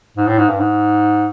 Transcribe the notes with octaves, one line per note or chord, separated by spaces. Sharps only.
G#2
A2
G#2
G2
G#2